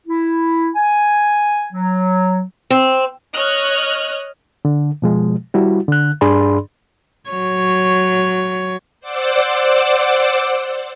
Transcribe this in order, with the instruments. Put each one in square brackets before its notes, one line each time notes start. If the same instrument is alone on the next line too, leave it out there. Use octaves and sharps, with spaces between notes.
[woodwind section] E4
G#5
F#3
[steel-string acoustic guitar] C4
[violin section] C#5 D#5 F6 F#6
[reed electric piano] D3
B2 F3 G#3
G3 E4 F#4
D3 F#6
G2 D4 G#4 D5 B5 C6
[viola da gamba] F#3 C#5
[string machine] C5 D5 F#5 D6 E6